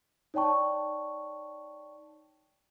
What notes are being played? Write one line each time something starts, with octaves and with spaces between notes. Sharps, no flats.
D#4 C#5 D5 G5 A5 C#6